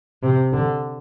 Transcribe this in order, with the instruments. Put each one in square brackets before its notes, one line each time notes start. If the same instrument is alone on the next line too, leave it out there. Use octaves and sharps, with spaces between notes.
[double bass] C3
D3